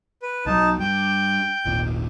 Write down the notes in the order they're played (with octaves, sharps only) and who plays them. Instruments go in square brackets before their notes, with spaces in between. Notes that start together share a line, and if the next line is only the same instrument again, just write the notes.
[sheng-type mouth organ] B4
[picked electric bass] B1 F#3 [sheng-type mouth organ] D#4 A5
[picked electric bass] G2 [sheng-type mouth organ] G5
[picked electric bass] G#1 D#2 A#2